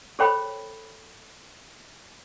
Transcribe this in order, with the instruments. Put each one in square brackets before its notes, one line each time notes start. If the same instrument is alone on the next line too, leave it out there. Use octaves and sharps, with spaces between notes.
[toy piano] G#4 A4 C5 C#5 G5 B5